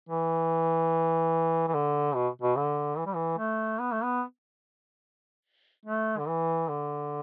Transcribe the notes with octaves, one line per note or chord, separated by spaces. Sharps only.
E3
E3
D3
B2
B2
D3
E3
G3
E3
A3
B3
A3
B3
A3
D3
E3
D3